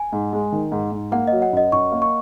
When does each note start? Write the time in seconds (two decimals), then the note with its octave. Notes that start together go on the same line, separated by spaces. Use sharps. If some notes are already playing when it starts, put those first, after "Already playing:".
Already playing: G#5
0.12 G#2
0.33 G#3
0.52 D#3
0.72 G#2
0.92 G#2
1.12 A#3 F#5
1.27 F#3 D#5
1.42 F#5
1.53 F#2 D#5
1.72 F#2 C#6
1.92 A#3
2.02 C#6